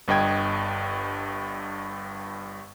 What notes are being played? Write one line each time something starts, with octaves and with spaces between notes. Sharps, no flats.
G1 G2 D#5 G5 G#6